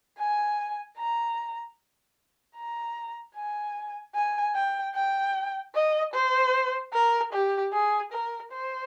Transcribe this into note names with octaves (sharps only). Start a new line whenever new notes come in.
G#5
A#5
A#5
G#5
G#5
G5
G5
D#5
C5
A#4
G4
G#4
A#4
C5